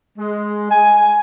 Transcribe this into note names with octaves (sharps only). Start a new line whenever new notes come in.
G#3
G#5